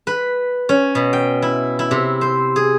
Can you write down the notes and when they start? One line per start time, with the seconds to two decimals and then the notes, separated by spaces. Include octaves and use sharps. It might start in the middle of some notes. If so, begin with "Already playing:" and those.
0.07 B4
0.69 C#4
0.95 B2
1.13 G5
1.42 E4
1.79 E4
1.91 C3
2.21 C5
2.56 G#4